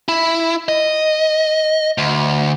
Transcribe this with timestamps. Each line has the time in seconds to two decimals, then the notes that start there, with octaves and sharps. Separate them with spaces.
0.09 E4
0.69 D#5
1.98 D2